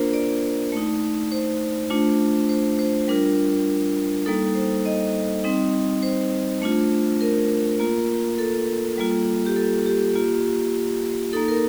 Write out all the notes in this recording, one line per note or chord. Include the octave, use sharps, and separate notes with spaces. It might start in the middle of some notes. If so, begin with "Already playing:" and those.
Already playing: A#3 D4 F4 A#4 C5
D5
A3 D#4
C5
A3 D4 F4
C5
C5
G3 D4 F4 A#4
G3 A#3 D#4 A4
C5
D#5
G3 C4 D#4
C5
A3 D4 F4
A#4
A#3 F4
A4
G3 A#3 F4
G4
A4
G4
A#3 F4
A#3 D#4 A4
A#4